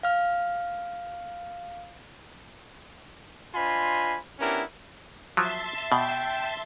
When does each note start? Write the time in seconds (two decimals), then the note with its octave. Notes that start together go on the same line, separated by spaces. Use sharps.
0.03 F5 F6
3.55 D4 F4 C5 D#5 G#5 B5
4.39 B3 C#4 D4 E4 G4 A#4
5.37 F3 F#3 E5 A5 C6
5.92 B2 G5